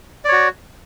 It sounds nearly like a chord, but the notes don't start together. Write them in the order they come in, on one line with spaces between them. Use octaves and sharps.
D5 C#5 F#4